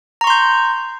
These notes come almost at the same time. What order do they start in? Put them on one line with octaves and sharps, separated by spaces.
A#5 C#6 C6 G6